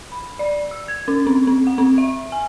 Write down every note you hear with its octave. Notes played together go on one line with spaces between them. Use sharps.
B5
D5
E6
G#6
C#4
C4
C4
F#5
C4
E5
G#5